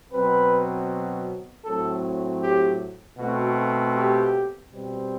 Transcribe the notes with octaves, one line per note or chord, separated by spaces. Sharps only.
B2 F#3 C4 B4
A2 F#3 C4 A4
G4
B2 A3 C4 F#4
G4
B2 G3 C4